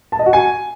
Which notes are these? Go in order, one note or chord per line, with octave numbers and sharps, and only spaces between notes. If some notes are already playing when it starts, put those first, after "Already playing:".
A5
D#5
F#4
G#5